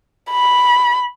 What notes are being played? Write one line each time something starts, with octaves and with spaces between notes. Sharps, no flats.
B5